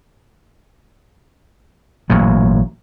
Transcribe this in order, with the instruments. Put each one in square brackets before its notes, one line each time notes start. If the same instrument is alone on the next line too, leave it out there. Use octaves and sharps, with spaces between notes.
[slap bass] A1 A#2 F#3